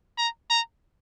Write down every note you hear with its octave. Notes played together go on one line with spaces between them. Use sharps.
A#5
A#5